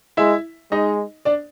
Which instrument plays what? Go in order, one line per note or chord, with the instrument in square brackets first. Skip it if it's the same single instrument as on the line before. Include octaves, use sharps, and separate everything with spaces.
[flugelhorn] G#3 [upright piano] E4 E5
[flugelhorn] G#3 [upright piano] D#4 D#5
[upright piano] D4 D5